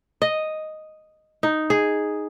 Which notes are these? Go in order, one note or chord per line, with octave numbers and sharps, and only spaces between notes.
D#5
D#4
G#4